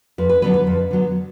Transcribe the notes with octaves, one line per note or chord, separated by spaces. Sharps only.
F2 B4
B4
D3 F#3 B3 B4
B4
F2
D3 F#3 B3